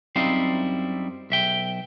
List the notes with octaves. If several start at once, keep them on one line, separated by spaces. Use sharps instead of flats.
F#2 G3 C4 D#4 E4 F5
B1 E5 G5